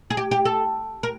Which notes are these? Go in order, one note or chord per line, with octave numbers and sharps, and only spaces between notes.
G#4
G4
G4
A4
A#4